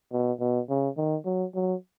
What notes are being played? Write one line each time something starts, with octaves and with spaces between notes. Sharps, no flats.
B2
B2
C#3
D#3
F#3
F#3